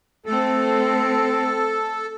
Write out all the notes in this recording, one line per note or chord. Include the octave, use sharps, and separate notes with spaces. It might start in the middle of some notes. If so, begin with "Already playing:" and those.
A3 C4 A4